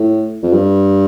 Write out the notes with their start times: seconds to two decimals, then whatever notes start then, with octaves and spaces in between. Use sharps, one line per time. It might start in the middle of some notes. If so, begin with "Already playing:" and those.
Already playing: A2
0.43 F2
0.53 G2